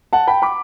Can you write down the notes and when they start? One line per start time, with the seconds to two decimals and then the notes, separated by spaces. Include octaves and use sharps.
0.13 F#5 A5
0.27 G5 B5
0.42 B5 D6